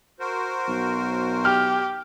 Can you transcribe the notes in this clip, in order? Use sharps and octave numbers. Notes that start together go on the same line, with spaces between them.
F#4 A#4 C5
B1
G4 F6